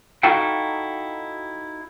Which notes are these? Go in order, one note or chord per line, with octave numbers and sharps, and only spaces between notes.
D#4 E4 F#4 A4 F5 G5